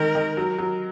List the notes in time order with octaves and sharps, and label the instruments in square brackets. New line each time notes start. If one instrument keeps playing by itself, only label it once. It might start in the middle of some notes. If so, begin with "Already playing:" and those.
Already playing: [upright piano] D#3 G#3 [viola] A#4
[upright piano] D#3
F#3
F#3